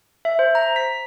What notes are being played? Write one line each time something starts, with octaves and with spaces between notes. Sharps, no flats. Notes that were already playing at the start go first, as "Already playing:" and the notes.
E5
C5
A#5
B6